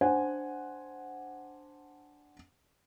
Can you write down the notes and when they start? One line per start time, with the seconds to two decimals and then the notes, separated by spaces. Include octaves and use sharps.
0.01 D4 C5 F#5 G#5